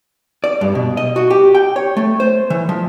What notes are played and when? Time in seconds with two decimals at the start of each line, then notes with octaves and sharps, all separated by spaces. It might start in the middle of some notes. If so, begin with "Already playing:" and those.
0.44 D5
0.61 G2
0.75 B2
0.97 D#5
1.16 F#4
1.30 G4
1.55 G5
1.76 C#5
1.97 A3
2.20 C5
2.50 E3
2.69 F3